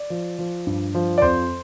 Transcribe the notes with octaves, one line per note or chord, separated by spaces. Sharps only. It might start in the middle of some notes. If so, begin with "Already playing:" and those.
Already playing: D5
F3
F3
G2
F3
D5
F2 C5